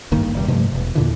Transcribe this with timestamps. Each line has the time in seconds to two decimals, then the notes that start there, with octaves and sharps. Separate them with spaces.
0.12 G#1 G2 D#3 A#3
0.34 F1 A2 G3
0.48 G2 C3 F3 A3
0.72 E1
0.95 D#2 A#2 D3 E3